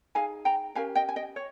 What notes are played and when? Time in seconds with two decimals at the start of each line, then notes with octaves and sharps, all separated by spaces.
0.15 D#4 G#4 F5 G#5
0.45 G5 A#5
0.75 C#4 G4 A#4 F5 G#5
0.95 D#5 G5
1.09 G#5
1.16 D#5 G5
1.36 C#5